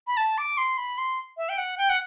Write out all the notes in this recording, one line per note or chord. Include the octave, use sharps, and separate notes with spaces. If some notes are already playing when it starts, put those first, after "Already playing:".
B5
A5
D6
C6
B5
C6
E5
G5
F#5
G5
F#5